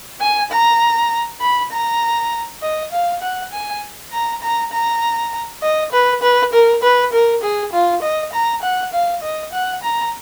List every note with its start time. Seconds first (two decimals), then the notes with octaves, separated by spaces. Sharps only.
0.21 G#5
0.51 A#5
1.41 B5
1.71 A#5
2.62 D#5
2.92 F5
3.21 F#5
3.52 G#5
4.12 A#5
4.42 A#5
4.72 A#5
5.62 D#5
5.92 B4
6.22 B4
6.53 A#4
6.82 B4
7.12 A#4
7.42 G#4
7.73 F4
8.02 D#5
8.33 A#5
8.62 F#5
8.93 F5
9.22 D#5
9.53 F#5
9.82 A#5